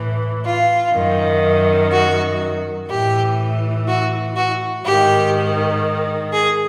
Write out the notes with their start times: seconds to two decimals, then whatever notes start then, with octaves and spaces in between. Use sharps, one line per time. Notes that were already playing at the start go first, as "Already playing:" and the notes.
Already playing: A2 E3
0.45 F4
0.94 F#2 D#3
1.91 F#4
2.89 A2 E3 G4
3.88 F#4
4.37 F#4
4.85 G#2 D#3 G4
6.33 G#4